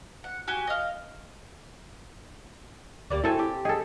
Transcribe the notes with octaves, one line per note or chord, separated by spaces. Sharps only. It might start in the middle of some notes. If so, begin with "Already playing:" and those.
F#5
F#4 G4 G5 G#5
D#5 F5
D2 G3 A#3 D5
F#3 C4 E4 A4 G#5 A5
G4
G#4 A4 D#5 G5